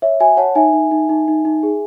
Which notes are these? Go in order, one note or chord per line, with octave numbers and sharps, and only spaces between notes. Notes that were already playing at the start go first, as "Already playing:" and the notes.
C#5 E5
F#4 E5 G#5
C#5 F#5 A5
D#4 E5 G#5
D#4
D#4
D#4
D#4
D#4
G#4